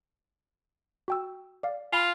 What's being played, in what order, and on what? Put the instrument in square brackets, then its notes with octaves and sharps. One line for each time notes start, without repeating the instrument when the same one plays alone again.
[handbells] F#4 G5 E6
D5 F5
[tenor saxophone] F4 [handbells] G#5 B5